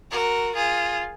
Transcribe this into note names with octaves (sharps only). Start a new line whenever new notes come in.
F#4 A#4
F4 G#4